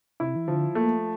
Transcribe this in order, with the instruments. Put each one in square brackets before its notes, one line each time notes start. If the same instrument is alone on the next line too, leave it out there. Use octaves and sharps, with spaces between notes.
[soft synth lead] C3 [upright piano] E4
[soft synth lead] E3
[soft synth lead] D3 [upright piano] F3
[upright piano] A3 [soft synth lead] A#3